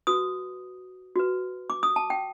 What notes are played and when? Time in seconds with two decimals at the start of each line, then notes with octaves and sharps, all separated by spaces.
0.07 F#4 B4 D#6
1.16 F#4 B4
1.70 D6
1.83 D#6
1.96 A5
2.10 G5